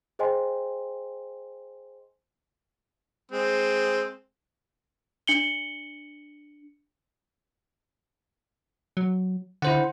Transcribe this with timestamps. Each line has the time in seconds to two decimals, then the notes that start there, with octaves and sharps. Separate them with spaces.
0.19 G#4 C5 D#5 G5 G#5 C6
3.31 G#3 C4
5.27 D4 C#7 F#7 G7
8.97 F#3
9.62 D3 E4 C5 F#5